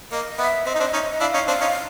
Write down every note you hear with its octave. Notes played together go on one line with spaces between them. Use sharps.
A#3 D#5
B3 E5
C4 D#5
D#4
C4 D4
C#4 D#4
D4 E4 F5
C#4 D#4
C4 D4 F5
C#4 D#4